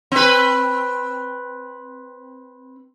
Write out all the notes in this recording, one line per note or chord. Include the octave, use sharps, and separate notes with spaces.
C4 B4